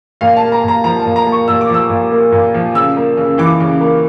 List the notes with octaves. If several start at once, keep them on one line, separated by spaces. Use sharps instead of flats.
A#2 F5
A5
A#3
A#5
A#2 A#5
F3 A#5
A5
A#2
A#5
A#3
C#6
A#2 E6
D6
F3 E6
A#2
A#3
A#2
F3
C#3 E6
A#3
C#3
E3 D6
C#3
A#3